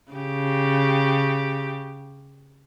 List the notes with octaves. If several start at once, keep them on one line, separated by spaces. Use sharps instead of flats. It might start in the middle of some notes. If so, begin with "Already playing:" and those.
C#3 G4